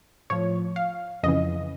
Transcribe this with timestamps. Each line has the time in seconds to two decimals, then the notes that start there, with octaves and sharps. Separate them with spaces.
0.30 A2 F3 C#5
0.76 F5
1.23 F2 C#3 E3 D#5